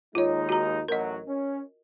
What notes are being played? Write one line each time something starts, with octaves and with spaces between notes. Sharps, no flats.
D#2 G#3 D#4 F4 C#5
F#4 A#5
A1 F#3 A#4 D#5
C#4